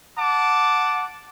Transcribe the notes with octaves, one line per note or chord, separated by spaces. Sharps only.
F#5 A5 D6